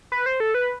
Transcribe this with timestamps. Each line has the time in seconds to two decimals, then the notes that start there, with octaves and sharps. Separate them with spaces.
0.12 B4
0.26 C5
0.40 A4
0.54 B4